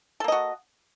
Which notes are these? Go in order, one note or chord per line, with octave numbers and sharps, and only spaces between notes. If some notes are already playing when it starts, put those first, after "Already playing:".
A#3 F#4 A4 D#5